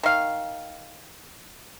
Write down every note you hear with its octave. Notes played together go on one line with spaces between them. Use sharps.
D#3 F5